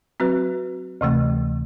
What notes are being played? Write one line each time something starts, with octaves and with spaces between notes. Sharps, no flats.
F#3 C4 F#4 B4
D2 C3 E3 A3